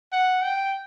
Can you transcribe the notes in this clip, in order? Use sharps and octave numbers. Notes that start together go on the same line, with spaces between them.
F#5
G5